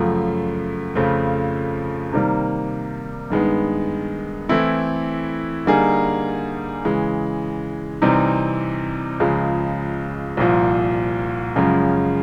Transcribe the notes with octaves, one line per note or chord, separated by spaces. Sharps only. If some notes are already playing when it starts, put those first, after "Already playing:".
Already playing: F#2 C#3 F3 A3
F2 C#3 F3 A3
C3 D#3 G3 A#3
G2 D#3 G#3 B3
E3 A3 C4 E4 A4
D3 G3 A#3 D#4 G#4
C#3 E3 G#3
C3 E3 G3 C4 D#4
C#2 C#3 F3 G#3
C2 A#2 F3
F#2 C#3 F3 G#3 C#4